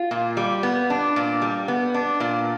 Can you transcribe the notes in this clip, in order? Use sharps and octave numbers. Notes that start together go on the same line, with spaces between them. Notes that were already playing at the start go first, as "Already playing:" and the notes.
Already playing: F4
A#2
G3
B3
D4
A#2
G3
B3
D4
A#2